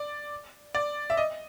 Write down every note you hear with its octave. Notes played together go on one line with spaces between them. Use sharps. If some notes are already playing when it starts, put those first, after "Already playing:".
Already playing: D5
D5
E5
D#5